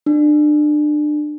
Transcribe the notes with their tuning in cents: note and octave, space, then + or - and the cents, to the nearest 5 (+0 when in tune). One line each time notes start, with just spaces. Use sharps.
D4 +30